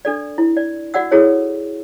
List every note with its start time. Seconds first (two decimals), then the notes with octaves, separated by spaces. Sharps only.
0.05 D4 A4 D5
0.38 E4
0.57 D5
0.94 F#4 D5 F#5 E6
1.11 E4 F#4 G#4 A4 C#5